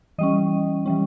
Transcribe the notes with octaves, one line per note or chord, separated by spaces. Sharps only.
E3 G3 C#4 D#5
E3 G3 C#4